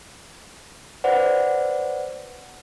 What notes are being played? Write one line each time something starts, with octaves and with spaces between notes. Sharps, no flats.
B4 C5 D5 F#5